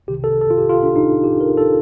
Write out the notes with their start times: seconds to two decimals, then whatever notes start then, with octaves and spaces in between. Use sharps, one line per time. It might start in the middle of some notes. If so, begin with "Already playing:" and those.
0.07 C2 C3 D#3 G4
0.24 A4
0.41 A4
0.51 F4
0.58 G4
0.69 F4
0.83 D4
0.96 D#4
1.24 G4
1.41 A#4
1.57 A4